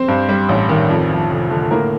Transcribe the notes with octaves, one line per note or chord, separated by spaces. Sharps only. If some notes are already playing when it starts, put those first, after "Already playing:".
Already playing: C4 C5
G2
G3
A1
D#3
F2
F3
F1
D3
A2 A#3 A#4